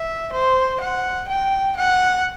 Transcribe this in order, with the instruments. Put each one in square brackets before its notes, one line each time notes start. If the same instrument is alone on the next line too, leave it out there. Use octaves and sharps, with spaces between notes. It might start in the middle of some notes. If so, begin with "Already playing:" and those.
Already playing: [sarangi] E5
C5
F#5
G5
F#5